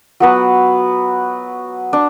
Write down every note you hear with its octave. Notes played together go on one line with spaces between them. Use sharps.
F#3 B3 F#4 B4
D4